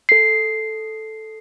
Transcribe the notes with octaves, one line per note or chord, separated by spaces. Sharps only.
A4 C7